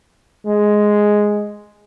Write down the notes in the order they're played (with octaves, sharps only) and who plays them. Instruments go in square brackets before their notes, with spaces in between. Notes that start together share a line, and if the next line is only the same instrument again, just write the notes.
[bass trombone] G#3